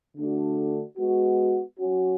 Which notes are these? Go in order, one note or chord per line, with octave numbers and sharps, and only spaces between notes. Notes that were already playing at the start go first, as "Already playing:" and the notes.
D3 A3 D4 F#4
G#3 B3 F#4
F#3 C#4 F#4